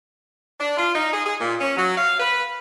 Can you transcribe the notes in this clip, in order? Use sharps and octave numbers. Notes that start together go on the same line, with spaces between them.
D4
F4
D#4
G#4
G#4
A#2
C#4
F#3
F5
B4